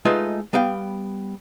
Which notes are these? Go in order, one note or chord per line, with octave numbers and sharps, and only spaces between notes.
G#3 A3 D#4 F4 B4
G3 B3 F5 G5